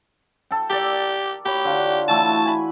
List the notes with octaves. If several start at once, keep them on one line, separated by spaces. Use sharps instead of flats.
A4 G5
G4 A#4 D5
G4 C#5 A#5 B5
D3 F4 F#5
E3 A3 F#4 A5
G#5 B5